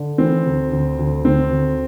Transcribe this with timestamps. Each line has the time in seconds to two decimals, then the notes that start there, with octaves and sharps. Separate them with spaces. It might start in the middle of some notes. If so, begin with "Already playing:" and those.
Already playing: D3
0.18 E3 C4
0.46 D2
0.71 D2
0.99 D2
1.25 D2 C4
1.51 D2